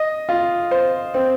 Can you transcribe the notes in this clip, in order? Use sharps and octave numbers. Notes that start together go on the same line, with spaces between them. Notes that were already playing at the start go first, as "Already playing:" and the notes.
Already playing: D#5
F4
C5
C4